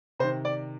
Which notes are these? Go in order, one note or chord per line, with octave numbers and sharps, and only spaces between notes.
C3 D#3 C5
D5